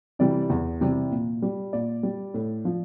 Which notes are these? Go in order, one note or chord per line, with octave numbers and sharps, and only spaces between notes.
C3 E3 G3 D5
E2
C3 E3 G3
A#2
G3
A#2 D5
G3
A2
F3